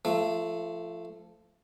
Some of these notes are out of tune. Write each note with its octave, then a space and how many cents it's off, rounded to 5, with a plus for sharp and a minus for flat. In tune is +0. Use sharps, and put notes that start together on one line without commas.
F3 -25 A3 +0